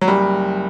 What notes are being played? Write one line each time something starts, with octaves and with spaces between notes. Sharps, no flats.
F#3
F#1 G3